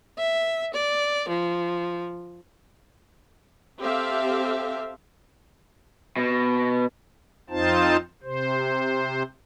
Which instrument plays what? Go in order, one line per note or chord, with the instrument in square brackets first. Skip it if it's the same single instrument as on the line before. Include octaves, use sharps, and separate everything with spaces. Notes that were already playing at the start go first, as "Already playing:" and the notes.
[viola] E5
D5
F3
[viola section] C4 G4 A4 E5 F5
[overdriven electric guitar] B2
[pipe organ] F2 C4 D#4 F4 C5 A5
C3 C5